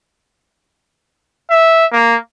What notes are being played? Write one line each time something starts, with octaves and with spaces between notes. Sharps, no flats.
E5
A#3